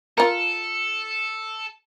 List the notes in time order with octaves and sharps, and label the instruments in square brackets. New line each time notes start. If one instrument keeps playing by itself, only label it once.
[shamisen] F4 A#4 [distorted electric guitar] A4